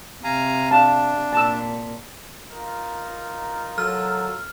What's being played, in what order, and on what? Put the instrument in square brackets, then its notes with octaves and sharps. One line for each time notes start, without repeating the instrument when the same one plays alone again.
[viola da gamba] C3 [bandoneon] F5 G#5 A#5
[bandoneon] D4 [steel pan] F5 A5
[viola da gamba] A#2 [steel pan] A5 E6
[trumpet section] D#4 F4 A#4
[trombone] F#3 [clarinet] A4 [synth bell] F6